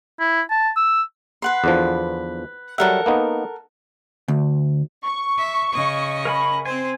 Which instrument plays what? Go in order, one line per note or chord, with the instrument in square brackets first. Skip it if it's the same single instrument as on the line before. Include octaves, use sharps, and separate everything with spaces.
[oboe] E4
A5
E6
[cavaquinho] B4 F#5 C6
[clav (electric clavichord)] E2 D3 F3
[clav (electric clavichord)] F#3 G3 E5 [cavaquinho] A4 A#4 F#5
[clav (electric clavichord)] A#3 B3 D#4
[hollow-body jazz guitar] D2
[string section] C#6
[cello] E5
C#3 D#5
[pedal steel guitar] A#4 G#5 B5
[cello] C4 C5 [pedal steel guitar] G#5